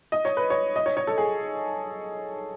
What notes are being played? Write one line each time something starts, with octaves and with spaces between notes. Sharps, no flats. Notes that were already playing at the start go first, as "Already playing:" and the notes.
D#5
C#5
B4
C#5
D#5
C#5
C#5
A4
G#4